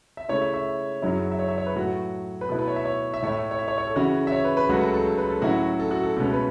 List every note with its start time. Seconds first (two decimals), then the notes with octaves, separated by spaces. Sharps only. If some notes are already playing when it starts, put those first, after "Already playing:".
0.17 E5
0.29 C#3 A3 C#4 E4 C#5
0.41 E5
0.54 E5
1.02 F#2 C#3 F#3 C#4 E4
1.32 E5
1.39 C#5
1.48 E5
1.58 C#5
1.66 B4
1.76 A2 F#3 A3 F#4
2.41 B4
2.49 B2 A3 E4 A4
2.59 B4
2.68 C#5
2.76 E5
2.85 C#5
3.14 E5
3.23 A2 A3 E4 C#5
3.32 E5
3.51 C#5
3.59 E5
3.68 C#5
3.78 C#5
3.87 A4
3.96 C#3 E3 C#4 E4 F#4
4.27 E5
4.32 C#5
4.45 B4
4.57 B4
4.69 C#2 C#3 F#3 A3 F#4
4.76 B4
4.81 A4
4.94 A4
5.05 A4
5.18 B4
5.30 A4
5.42 A2 F#3 C#4 E4 F#4
5.79 A4
5.91 F#4
6.03 A4
6.16 C#2 B2 A3 C#4
6.33 B4